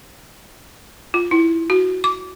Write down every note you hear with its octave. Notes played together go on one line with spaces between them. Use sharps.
F4
E4
F#4
D6